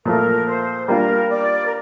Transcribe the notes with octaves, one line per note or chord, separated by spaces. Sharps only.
A#2 F3 A3 A#4
C5
G3 A#3 D4 F4 A#4
D5
A#4